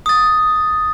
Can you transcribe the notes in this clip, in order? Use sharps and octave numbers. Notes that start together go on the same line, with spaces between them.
D#6 A6